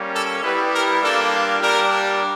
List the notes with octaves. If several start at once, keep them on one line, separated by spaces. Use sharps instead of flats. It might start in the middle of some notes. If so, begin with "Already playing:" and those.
Already playing: G3 A#3 C#4
A4
G3 B3 E4 G4 B4
A#4
G3 A#3 D4 F4 A4
G3 A#3 D4 G4 A#4